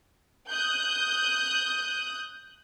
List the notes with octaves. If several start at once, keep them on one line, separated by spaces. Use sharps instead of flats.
D#6 F#6 G6